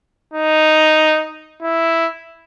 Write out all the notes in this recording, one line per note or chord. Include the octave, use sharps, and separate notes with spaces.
D#4
E4